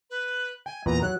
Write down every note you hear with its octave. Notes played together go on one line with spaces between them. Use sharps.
B4
G5 G#5
E2 A#2 B4 A#5
F#3 F#6